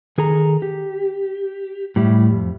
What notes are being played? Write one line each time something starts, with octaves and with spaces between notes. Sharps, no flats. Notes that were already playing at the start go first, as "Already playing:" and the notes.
D#3 G#4 A4 A#5
G4
A2 G3 E4
F2